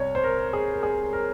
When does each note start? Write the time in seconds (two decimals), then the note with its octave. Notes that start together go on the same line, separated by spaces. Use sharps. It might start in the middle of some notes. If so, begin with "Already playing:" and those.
Already playing: C2 C3 C#5
0.15 C5
0.24 A#4
0.53 G#4
0.73 A#4
0.83 G#4
1.13 A#4